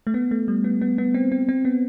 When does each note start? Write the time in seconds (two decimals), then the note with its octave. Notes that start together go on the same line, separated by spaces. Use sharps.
0.07 A3
0.14 B3
0.31 A3
0.48 G3
0.64 B3
0.81 B3
0.98 B3
1.14 C4
1.32 C4
1.49 C4
1.65 B3